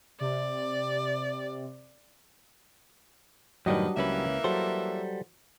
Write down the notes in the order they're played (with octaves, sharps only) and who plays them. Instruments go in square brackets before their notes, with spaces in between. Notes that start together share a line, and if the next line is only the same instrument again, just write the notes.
[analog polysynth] C3 [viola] D5
[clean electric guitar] F#2 A2 D#3 [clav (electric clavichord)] F#3 G3 D4 [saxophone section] B4 D#5
[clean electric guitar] C#2 C#4 B4 [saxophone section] E3 A#3 E5
[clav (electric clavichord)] F#3 [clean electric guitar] G3 A4 C5